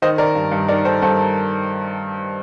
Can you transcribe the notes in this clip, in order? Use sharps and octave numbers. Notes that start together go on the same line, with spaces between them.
D#3 C5 D#5
D#3 A#4 D5
G2
G2
D#3 A#4 D5
D#3 A4 C5
G2 A4 C5